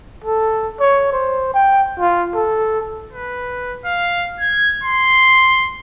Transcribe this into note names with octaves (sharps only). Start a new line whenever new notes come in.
A4
C#5
C5
G5
F4
A4
B4
F5
G#6
C6